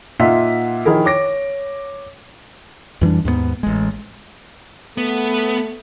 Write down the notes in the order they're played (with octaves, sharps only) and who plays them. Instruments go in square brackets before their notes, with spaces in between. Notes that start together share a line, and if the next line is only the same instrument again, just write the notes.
[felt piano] A#2 D#4 F4 E5 F#5 B6
D#3 F3 E4 G#4 A#4
C#5 D6 A#6 D7
[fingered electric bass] F2 E3 G3 D4
D#2 G#2 A3 B3
A1 G#3
[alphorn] A3 [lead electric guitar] B3